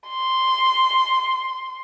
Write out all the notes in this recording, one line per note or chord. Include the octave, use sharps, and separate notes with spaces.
C6